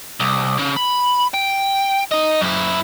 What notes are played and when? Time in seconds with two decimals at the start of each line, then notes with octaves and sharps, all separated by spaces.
0.20 C2
0.59 C#3
0.77 B5
1.34 G5
2.12 D#4 D#5
2.42 F#2 E4